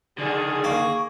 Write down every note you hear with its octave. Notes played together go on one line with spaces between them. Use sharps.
D3 D#3 G#4 D5
A#3 C#6